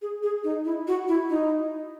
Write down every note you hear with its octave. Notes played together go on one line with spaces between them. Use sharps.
G#4
G#4
D#4
E4
F#4
E4
D#4